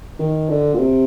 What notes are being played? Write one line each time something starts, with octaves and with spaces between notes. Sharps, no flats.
D#3
D3
A#2
C3